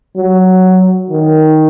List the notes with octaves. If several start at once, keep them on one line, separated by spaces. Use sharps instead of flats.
F#3
D#3